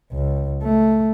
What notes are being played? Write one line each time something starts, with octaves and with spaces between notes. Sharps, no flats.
C#2
A3